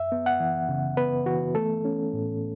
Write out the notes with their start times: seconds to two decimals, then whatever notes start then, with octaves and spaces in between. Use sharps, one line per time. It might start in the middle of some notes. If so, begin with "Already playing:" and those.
Already playing: F#2 E5
0.12 B3
0.26 F#5
0.40 E3
0.69 C#3
0.97 B3 B4
1.26 E3 F#4
1.55 A3 A4
1.85 C#4
2.13 A2